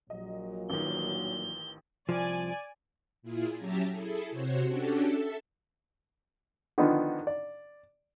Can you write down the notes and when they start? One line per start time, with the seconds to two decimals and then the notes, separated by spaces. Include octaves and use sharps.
0.10 A#1 A#2 F#3 D#5
0.70 A1 D#3 G7
2.09 C2 F3 D5 G#5
3.22 A#2 E4 F4 G#4
3.56 F#3 C#4 G4 E5 A5 A#5
3.89 E4 G#4 A4
4.29 C3 F#4 C5 C#5
4.66 C#4 D4 F#4 G4 A4
5.06 A4 E5
6.78 D3 D#3 F3 B3
7.27 D5